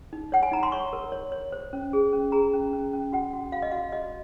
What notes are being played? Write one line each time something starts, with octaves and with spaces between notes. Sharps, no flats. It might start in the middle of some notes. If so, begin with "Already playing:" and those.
D#4
C#5 F#5
G#5
D#4 A#5
C6
C#5 C#6
A#4
C#5
C#5
C5
C#4
G#4
C#4
G#4 A#5
C#4
C#4
C#4
F#4 F#5
F#4
F#4 F5
D#5
F#4 F5
F#4 D#5